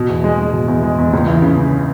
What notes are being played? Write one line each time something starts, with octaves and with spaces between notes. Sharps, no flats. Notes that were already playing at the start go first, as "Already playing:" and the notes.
Already playing: B2
E2
G#3
G#3
B2
E2
G#3
E2
C#2
E3
C#3
C#3